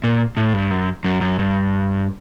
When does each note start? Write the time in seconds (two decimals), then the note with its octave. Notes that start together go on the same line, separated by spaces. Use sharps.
0.04 A#2
0.37 A2
0.53 G2
0.71 F#2
1.04 F#2
1.21 F#2
1.39 G2